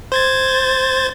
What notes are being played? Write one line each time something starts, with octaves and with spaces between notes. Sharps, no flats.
C5 G#6 A6